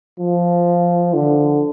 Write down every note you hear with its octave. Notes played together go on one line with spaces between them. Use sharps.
F3
D3